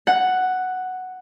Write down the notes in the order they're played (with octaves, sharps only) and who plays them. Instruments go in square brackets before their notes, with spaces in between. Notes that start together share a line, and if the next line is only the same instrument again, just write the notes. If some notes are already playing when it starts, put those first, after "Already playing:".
[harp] F#5